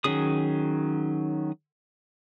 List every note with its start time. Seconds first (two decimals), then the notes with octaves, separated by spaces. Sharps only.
0.04 D#3 F#3 C#4 G#4 D#6